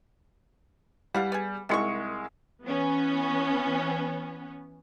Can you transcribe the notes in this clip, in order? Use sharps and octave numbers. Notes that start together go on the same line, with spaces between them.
E3 G3 F5 F#5
B3 G#4
C2 D#3 G#3 C6 C#6 C#7
E3 B3 C#4